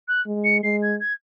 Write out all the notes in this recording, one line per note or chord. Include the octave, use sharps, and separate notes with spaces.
F#6
G#3
C#7
G#3 C7
G#6
G#6